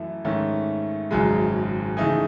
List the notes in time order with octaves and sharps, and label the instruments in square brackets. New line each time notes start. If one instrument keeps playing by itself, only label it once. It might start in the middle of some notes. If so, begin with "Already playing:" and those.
Already playing: [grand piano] F#2 E3 A3 E4
G#2 D#3 A3 C#4
G#1 F#2 C#3 G#3
C#3 E3 A3 D#4 G#4